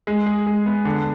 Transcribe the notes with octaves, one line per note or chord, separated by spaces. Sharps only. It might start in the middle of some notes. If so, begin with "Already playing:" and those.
G#3
G#4
G#3
B3
D3